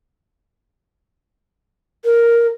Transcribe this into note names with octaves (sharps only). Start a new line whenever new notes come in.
A#4